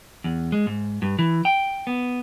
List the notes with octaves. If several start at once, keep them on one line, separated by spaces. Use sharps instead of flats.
E2
G#3
G#2
G2
E3
G5
B3